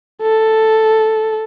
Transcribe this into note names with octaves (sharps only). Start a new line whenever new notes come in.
A4